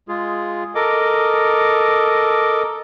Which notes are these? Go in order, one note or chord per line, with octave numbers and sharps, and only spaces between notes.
G#3 F4 G#4
A4 A#4 D#5 D6